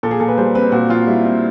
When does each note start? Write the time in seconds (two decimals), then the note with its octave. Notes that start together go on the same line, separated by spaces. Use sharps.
0.03 A#2 A4
0.11 G#4
0.20 A#2 A4
0.28 B4
0.38 G3 C5
0.55 C4 B4
0.72 A#2 F#4
0.89 A#2 F4
1.07 G3 E4
1.25 C4